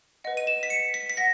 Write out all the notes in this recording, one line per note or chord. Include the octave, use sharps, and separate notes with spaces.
B4 D#5 F#5
D#7
E7
B6
C#7
B6
B6
F#5 A#6